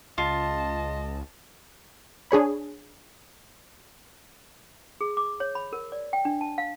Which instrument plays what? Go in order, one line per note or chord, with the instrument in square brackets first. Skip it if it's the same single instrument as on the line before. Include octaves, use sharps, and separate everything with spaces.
[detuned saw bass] C#2 [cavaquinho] F4 [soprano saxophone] D#5 [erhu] A5
[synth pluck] D4 G#4 C#5 B5
[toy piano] G#4
D6
C#5
B5
A#4
D5
G5
D4
A5
F5